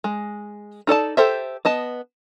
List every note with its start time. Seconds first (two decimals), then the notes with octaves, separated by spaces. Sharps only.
0.04 G#3
0.87 D#4 A4 D5 A5
1.17 G4 A4 C5 E5
1.65 B3 D#5 A5